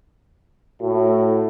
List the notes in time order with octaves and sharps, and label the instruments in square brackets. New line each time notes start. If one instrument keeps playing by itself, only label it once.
[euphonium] A2 [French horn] F#4